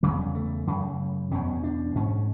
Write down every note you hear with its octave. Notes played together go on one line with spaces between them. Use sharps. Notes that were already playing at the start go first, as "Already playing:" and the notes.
E2 C#3 G3
A3
F#2 C#3
E2 B2 C#4
D4
G#2 C#4